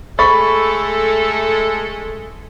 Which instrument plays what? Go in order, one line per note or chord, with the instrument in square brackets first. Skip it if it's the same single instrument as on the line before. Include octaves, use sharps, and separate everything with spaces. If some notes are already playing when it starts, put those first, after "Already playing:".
[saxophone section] G#3 A3 A4 [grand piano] B5 C#6 A6